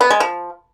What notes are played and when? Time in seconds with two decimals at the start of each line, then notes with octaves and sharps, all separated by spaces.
0.01 B3
0.10 G#3
0.20 F3